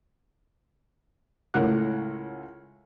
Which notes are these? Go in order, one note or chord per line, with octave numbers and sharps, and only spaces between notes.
C#2 A2 C#4 A#4 F#5 F#6